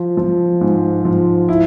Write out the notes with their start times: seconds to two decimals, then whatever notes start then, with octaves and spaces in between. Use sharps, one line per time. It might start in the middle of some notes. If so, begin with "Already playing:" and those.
Already playing: F3
0.17 F3
0.61 G#2
1.05 F3
1.49 E4